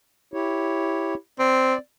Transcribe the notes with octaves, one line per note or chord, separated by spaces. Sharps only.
E4 G4 C#5
C4 D5